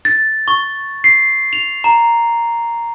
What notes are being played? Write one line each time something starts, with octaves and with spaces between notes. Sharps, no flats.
A6
C#6
C7
F7
A#5